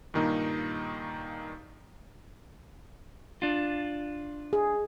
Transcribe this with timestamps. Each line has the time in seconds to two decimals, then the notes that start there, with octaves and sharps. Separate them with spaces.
0.14 G2 A#2 D#3 A#3 D#4
3.42 D4 F4
4.53 G#4